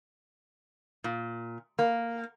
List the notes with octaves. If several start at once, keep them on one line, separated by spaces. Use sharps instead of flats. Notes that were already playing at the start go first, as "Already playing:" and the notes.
A#2
A#3